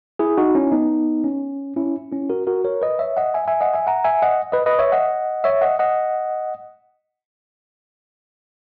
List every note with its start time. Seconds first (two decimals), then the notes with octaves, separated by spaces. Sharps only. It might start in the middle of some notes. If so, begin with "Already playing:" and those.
0.19 E4 G#4
0.37 D#4 F#4
0.55 C#4 E4
0.72 B3 D#4
1.24 C#4
1.77 C#4 E4
2.12 C#4 E4
2.30 F#4 A#4
2.47 F#4 A#4
2.65 A#4 C#5
2.82 B4 D#5
2.99 C#5 E5
3.17 D#5 F#5
3.34 E5 G#5
3.48 E5 G#5
3.61 D#5 F#5
3.73 E5 G#5
3.87 F#5 A#5
4.04 E5 G#5
4.22 D#5 F#5
4.52 B4 D#5
4.66 B4 D#5
4.79 C#5 E5
4.92 D#5 F#5
5.44 C#5 E5
5.61 D#5 F#5
5.79 D#5 F#5